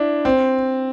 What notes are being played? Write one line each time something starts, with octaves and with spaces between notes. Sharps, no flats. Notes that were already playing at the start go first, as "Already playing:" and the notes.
Already playing: D4 E4
C4